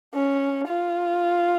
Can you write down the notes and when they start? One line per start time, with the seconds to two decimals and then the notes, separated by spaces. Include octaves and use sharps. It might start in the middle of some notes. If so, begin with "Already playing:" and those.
0.14 C#4
0.68 F4